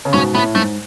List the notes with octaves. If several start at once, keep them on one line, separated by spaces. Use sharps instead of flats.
C#3
G#2 B2 C#4
A2 B3
G#2 A3